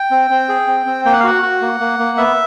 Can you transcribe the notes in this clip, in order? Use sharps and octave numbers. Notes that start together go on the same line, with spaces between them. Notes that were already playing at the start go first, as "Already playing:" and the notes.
Already playing: G5
C4
C4
G#4
C4
C4
A#3 G5
F#5
F5
F#4 F#5
F#4
A#3
A#3
A#3
B3 E5